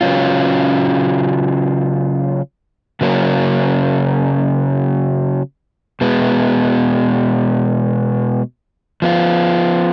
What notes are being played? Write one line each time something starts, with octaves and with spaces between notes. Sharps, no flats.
C#3 F#3 C#4 F4
C#3 F#3 A#3 C#4
B2 G#3 B3
F3 B3 F4